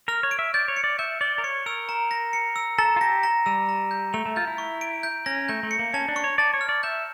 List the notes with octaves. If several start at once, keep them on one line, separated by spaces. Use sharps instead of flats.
A#4 F6
C#5
D7
E5
D5 G6
C#5
C#7
D5
E5 G6
D5 G7
A#4
C#5 C#7
A#4 E6
A#5
A#6
C#7
E6
A4 A#5
F4
G4 A#6
A#5
G3 E6
A#5
G6
A3 F7
A3
F4 G6
E4
C#6
D7
G6
C#4 A#6
A3 G6
A3
C#7
A#3
C#4 A5
D4
C#6
C#5
D5 A5
C#5
F6
D5
E5 G6